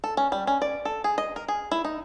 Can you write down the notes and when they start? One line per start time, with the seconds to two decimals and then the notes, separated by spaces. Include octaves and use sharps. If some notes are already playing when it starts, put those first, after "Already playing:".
0.04 A4
0.17 C#4
0.32 G3
0.47 C#4
0.62 D5
0.85 A4
1.04 G#4
1.18 D#5
1.36 A#4
1.48 G#4
1.71 E4
1.85 D#4